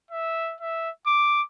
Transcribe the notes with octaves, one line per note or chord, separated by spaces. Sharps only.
E5
E5
D6